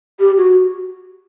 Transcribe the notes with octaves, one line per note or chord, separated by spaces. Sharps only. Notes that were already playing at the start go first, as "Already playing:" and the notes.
G4
F#4